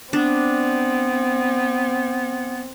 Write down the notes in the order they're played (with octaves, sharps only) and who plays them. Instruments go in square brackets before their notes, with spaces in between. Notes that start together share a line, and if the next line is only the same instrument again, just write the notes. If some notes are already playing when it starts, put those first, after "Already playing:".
[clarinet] B3 [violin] C4 [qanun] D4